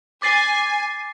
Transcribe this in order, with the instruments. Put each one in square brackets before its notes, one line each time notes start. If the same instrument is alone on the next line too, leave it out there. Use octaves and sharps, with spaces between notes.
[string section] G#5 [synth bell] D6 A6 C7